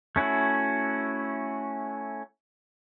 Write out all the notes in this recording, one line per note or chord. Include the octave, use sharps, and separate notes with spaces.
A3 C#4 E4 F#4